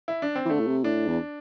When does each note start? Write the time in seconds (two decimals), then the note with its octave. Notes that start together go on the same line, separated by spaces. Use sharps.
0.08 E4
0.22 D4
0.36 C4
0.45 E3
0.50 D3 A3
0.60 A2
0.67 C3
0.84 A2 D4
1.07 E2